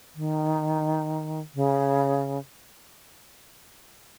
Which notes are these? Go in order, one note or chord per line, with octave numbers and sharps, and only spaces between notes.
D#3
C#3